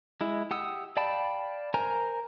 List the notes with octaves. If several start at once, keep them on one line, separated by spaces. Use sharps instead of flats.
G#3 E4
G4 F#5 D#6 E6
D5 F5 G5 A5 B5
A#4 C5 G#5 A#5